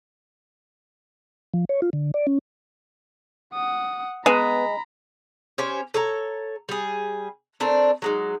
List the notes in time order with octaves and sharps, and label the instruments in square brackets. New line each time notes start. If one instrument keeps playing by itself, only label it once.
[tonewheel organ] F3
C#5
F4
D3
D5
C#4
[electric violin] F#5 D#6
[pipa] G#3 [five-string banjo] B3 B4 G#5 [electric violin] A#5 B5
[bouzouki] C#4 G4 C5 C#5
A4 C#5 A#5
G3 G#4
A3 C4 D4 A#4
F#3 G#3 D#4